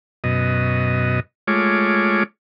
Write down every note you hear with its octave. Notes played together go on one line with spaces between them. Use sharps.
F#2 B2 D#5
G#3 A3 F4 C#5 D6